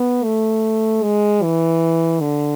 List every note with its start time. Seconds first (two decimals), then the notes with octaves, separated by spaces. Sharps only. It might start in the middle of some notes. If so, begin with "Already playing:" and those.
Already playing: B3
0.24 A3
1.03 G#3
1.42 E3
2.21 D3